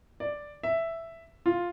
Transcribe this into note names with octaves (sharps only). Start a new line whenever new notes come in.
D5
E5
F4